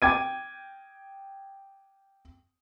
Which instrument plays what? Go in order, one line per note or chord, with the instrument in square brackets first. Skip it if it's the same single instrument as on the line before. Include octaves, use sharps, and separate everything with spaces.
[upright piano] G5 D6 G#6 D#7